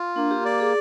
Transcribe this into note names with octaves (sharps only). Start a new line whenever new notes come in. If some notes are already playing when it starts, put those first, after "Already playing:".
Already playing: F4
A#3 D4
G4
G4 D5
G#4